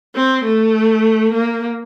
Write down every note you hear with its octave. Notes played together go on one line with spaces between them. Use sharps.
C4
A3
A#3